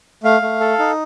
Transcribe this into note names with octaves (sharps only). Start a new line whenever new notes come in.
A3 F5
A3
A4
D#4